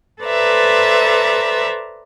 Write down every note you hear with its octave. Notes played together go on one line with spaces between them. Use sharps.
A4 B4 C5 D5 E5 A#5